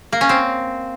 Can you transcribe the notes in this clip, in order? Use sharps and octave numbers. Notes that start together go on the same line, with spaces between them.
A#3
C#4
C4